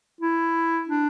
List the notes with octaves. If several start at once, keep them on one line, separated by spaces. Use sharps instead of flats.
E4
D4